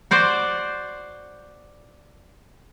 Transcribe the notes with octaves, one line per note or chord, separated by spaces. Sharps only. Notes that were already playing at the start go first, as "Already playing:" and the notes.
F#4 C5 D5